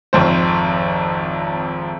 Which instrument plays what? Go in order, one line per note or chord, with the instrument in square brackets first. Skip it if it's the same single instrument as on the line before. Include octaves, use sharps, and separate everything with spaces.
[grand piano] G#1 F2 C5